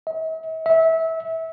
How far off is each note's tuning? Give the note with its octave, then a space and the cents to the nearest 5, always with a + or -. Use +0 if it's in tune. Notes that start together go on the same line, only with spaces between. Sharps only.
E5 -45
E5 -20